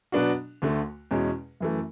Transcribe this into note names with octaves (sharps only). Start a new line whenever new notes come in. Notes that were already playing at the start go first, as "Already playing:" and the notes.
B2 F#3 B3 D4 F#4
D2 D3 A3
E2 B2 G#3 C#4
F#2 E3 A3